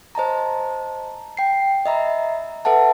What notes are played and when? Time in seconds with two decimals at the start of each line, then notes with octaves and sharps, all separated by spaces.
0.15 C5 D#5 A5 A#5
1.37 G5 C7
1.86 D#5 E5 A#5 B5
2.65 A4 B4 E5 F#5 A5